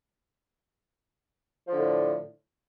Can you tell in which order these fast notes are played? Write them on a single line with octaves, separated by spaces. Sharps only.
F3 D3 A2